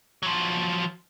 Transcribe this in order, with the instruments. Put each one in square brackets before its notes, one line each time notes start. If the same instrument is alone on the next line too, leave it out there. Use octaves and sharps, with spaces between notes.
[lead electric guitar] F3 F#3